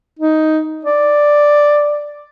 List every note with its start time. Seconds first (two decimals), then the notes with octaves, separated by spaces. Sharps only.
0.19 D#4
0.85 D5